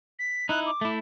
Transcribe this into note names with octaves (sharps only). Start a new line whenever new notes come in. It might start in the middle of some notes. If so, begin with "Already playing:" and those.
B6
D#4 E4 F#6
D6
A3 E4